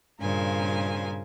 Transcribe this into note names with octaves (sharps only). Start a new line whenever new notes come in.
G2 A#2 C#3 A#4 C5 G#5